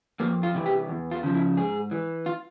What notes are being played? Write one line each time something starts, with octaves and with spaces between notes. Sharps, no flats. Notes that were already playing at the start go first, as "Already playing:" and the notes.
F2 A#3
F4
C3 E3
G4
E2
F4
C#3 F3
E4
G#2 G#4
E3
F4